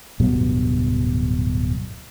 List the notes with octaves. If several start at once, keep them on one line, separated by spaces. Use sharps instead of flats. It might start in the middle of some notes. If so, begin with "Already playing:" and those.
D1 G2 B2 F#3